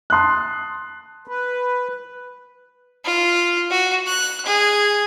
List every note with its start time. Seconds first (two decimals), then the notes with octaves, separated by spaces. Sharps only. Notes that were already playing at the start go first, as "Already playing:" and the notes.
0.10 A5 C6 D#6 F#6
1.28 B4
3.05 F4
3.71 F#4
4.07 F#6
4.46 G#4